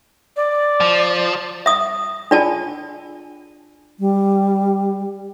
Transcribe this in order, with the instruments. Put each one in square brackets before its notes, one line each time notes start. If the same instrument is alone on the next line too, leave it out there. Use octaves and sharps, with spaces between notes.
[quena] D5
[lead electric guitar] F3
[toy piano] E5 D#6
D4 F4 D5 G#5 A5
[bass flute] G3